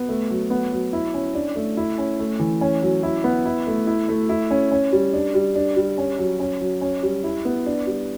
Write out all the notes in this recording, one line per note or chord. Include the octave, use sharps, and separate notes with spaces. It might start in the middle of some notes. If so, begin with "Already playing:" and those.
Already playing: B3
A3
F#3
B3
F#3
E4
C#4
D4
A3
E4
C#4
A3
E3
C#4
F#3
E4
B3
E4
A3
E4
A3
E4
C#4
C#4
G3
D4
G3
D4
G3
C#4
F#3
C#4
F#3
C#4
G3
E4
B3
D4
G3